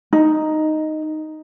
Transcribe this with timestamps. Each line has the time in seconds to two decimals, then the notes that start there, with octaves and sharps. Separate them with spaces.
0.13 D#4